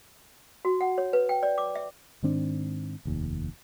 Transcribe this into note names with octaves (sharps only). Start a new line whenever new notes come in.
F#4
F#5
C#5
B4
G5
D5
D6
E5
G#2 D#3 C4 D4
F1 D#2